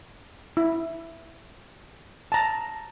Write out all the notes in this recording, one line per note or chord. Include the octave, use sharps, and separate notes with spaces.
E4
A5 A#5